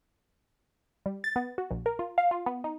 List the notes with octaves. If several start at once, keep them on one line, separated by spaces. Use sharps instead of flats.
G3
A6
B3
F#4
A#1
A#4
F4
F5
F4
B3
D#4